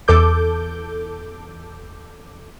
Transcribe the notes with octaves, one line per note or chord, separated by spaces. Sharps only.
E2 A4 D6 G6